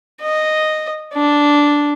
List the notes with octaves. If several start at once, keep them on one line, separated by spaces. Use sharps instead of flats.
D#5
D4